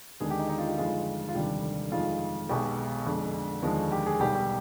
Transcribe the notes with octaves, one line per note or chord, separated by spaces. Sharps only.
D#2 D3 G#3 G#4
G4
D#4
D#4
F4
G4
G1 F2 D#3 G#3 F4
F4
F1 D#2 D3 G3 G4
F2 D#3 G#3 F4
B1 B2 G#3 G4
F2 D3 G#3
D#2 D3 F3 G#3
G4
G#4
B1 B2 G3 G4
G4